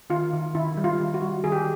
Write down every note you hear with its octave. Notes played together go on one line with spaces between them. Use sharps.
D#3 F4
D#3
D#3 E4
G3
F4
D#3
F#4
G3
D#3 G#4
G4